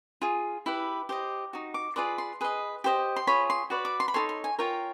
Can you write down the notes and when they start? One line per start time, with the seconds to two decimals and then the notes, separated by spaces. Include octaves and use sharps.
0.22 F4 G#4
0.66 E4 G4 B4
1.09 G4 C5 D#5
1.53 D#4 F#4
1.74 D6
1.96 F4 G#4 B4 D5 C6
2.18 C6
2.41 G#4 B4 D#5
2.84 G4 C5 D#5
3.16 C6
3.27 F4 G#4 C#5 B5
3.50 C6
3.70 F#4 B4 D5
3.85 D6
4.00 C6
4.08 B5
4.14 D#4 F#4 A4 C#5 C6
4.29 C6
4.44 G#5
4.59 F4 A#4 C#5 G5